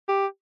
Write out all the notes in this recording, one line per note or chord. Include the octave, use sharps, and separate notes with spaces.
G4